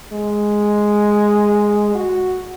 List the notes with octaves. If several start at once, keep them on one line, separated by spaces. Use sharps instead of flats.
G#3
F#4